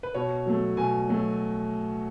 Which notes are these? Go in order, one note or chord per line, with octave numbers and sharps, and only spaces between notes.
B4
B2 C#5
F#3 A3
B2 G#5
F#3 A3